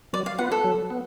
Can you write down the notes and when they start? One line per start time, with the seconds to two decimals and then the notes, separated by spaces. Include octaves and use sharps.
0.13 F#3 D5
0.26 F5
0.38 B3 F4 B4 F#5
0.52 A4
0.64 F#3
0.90 B3